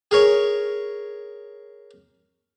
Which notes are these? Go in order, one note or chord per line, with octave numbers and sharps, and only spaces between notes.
G#4 A#4 C#5